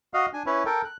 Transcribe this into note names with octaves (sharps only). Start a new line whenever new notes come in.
F#4 D#5 F5
D4 G#5
C#4 E4 B4 C#5
A4 A#4 G5
F#6